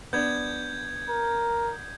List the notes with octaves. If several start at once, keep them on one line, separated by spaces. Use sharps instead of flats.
B3 D4 G6 G#6
A#4